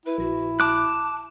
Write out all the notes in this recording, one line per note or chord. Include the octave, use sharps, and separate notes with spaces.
E4 B4
A#1 F#4
A5 D6 F#6